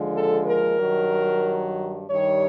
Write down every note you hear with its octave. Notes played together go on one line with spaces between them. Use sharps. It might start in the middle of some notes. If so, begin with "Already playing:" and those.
Already playing: D#2 D3 F3 G#3
A4
A#4
G2 D#3 F#3
G2 D#3 G3 C#5